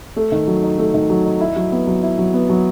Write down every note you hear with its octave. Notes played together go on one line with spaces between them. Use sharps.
A3
D#3
F#3
D#4
A3
D#3
F#3
D#4
E4
F#3
B3
F#3
E4
F#3
B3
F#3